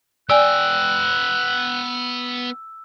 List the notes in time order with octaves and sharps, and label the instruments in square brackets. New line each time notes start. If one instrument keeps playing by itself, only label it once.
[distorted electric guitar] B3 G5 [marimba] D5 G#5 [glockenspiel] E6 [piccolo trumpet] F#6